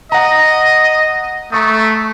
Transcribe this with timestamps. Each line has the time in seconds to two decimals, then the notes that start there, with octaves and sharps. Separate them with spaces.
0.12 D#5 F#5 A#5
1.52 A3 A#5 C#6 D#6